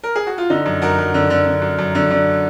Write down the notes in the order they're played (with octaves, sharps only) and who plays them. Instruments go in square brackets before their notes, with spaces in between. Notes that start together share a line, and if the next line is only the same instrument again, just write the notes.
[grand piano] A#4
G#4
F#4
F4
D3 D#4
F#2
F#2 F#4 A#4
F#2
D3
D3
D3
F#2
F#2
D3
D3